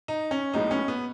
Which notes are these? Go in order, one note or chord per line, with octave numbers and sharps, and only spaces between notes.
D#4
C#4
B1 A2 G#3 B3 D#4
C#4
B3